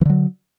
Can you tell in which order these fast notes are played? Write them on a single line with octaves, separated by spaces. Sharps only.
E3 D3 F#3